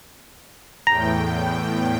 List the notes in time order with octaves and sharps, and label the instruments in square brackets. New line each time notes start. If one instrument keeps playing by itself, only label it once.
[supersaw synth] E2 A2 G5 [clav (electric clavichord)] A#5